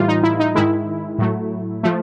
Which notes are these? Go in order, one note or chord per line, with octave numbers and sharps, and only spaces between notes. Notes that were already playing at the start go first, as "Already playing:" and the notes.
Already playing: A2 E3 G3 F4
D#4
E4
D#4
G#2 D#3 G#3 E4
A2 F#3 A3
F3 A3